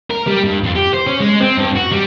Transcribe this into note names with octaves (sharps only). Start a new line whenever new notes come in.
A#4
G3
G2
F2
G4
C5
C#4
G#3
C4
G2
F#4
G3